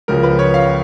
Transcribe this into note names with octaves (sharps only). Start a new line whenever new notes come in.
C#2 C#3 F3 A#4
B4
C#5
F5